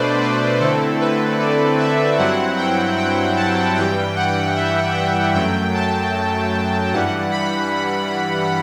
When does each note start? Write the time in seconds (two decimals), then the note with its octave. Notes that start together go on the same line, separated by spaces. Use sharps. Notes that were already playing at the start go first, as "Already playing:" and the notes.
Already playing: B2 A3 D4 B4 C5 D5
0.21 B4
0.60 D3 A3 C4 E4 A4
1.00 B4
1.39 D5
1.79 E5
2.18 G2 F#3 C4 E4 F#5
2.57 G5
2.98 G5
3.36 A5
3.76 G2 E3 G3 G5
4.16 F#5
4.56 E5
4.95 G5
5.34 F#2 F#3 A3 G5
5.74 A5
6.92 G2 E3 G3 F#5
7.32 B5